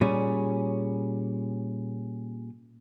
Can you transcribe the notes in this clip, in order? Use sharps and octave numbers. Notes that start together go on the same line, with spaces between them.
A#2 G3 C#4 G#4